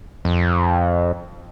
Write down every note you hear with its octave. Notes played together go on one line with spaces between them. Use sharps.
F2